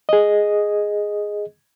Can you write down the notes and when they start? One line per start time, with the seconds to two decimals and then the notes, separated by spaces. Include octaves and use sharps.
0.09 G#4 D#5